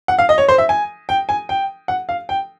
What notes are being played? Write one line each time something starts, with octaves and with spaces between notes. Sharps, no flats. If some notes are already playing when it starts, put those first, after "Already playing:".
F#5
F5
D#5
C#5
C5
E5
G#5
G5
G#5
G5
F#5
F5
G5